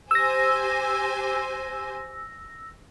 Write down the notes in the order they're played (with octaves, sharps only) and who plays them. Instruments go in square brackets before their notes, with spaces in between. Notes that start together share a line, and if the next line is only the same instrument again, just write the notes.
[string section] G4 C5 G#5 [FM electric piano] E6 A#6